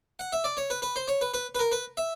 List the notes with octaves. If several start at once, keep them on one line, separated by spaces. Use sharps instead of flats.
F#5
E5
D5
C#5
B4
B4
C5
C#5
B4
B4
B4
A#4
B4
E5